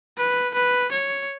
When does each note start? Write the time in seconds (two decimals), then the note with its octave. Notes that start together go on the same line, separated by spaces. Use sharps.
0.18 B4
0.55 B4
0.92 C#5